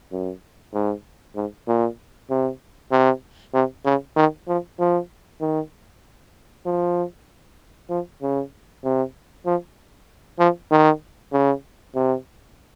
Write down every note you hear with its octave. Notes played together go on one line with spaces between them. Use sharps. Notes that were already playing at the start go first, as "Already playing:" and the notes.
F#2
G#2
G#2
A#2
C3
C3
C3
C#3
D#3
F3
F3
D#3
F3
F3
C#3
C3
F3
F3
D#3
C#3
C3